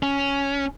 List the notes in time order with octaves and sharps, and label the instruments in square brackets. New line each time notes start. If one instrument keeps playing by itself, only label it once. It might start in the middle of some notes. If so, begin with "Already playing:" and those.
[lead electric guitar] C#4